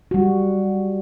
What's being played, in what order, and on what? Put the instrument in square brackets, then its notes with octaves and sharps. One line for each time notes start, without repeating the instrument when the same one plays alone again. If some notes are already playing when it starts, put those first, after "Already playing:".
[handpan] G3 F#4